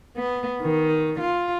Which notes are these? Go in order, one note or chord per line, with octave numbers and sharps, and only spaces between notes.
B3
D#3
F4